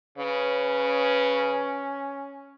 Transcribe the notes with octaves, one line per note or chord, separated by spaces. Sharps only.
C#3 C#4 B4